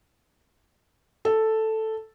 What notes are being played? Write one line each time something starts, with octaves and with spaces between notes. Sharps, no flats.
A4